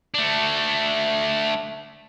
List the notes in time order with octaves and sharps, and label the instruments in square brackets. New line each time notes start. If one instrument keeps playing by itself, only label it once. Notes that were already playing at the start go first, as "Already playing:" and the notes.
[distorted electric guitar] A3 D4